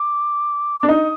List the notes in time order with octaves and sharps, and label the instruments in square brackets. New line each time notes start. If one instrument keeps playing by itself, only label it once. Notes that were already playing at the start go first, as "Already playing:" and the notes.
Already playing: [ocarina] D6
[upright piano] D4 [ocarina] D6
[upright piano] D#4 [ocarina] D#6